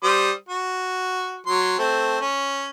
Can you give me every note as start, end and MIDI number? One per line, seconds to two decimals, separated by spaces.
0.03 0.31 55
0.03 0.31 72
0.03 0.31 87
0.49 1.41 66
1.47 1.77 54
1.47 1.77 84
1.79 2.20 57
1.79 2.20 60
2.20 2.70 61